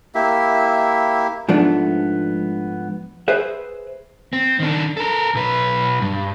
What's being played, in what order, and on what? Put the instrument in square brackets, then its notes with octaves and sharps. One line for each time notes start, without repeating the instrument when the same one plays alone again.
[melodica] A#3 E4 G4 E5
[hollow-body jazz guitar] G#2 F3 A3 B3 D4
G#4 B4 C5 E5
[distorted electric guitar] C4
D#3 D4
A4 A#4
B1 B4
G2